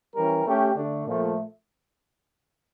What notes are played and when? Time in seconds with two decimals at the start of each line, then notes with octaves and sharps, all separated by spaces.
0.14 E3 G3 C#4 G4 A#4
0.45 A3 C#4 G4
0.75 D3 A3 D4
1.06 A#2 F3 A3